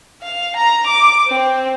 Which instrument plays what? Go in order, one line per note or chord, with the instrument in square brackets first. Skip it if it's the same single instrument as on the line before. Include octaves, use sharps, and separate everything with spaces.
[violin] F5
A#5
D6
C4